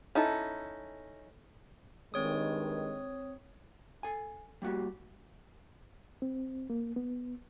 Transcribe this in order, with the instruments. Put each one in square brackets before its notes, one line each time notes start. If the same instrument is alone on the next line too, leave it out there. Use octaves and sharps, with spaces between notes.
[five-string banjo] C#4 D#4 E4 A4
[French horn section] G2 D#3 G#3 [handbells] C4 C#5 D#6
[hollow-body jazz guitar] A4 G#5
G3 A#3 F#4 G4
[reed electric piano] C4
A#3
B3